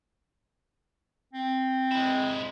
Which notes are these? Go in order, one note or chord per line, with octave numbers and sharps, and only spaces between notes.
C4
G#3 E4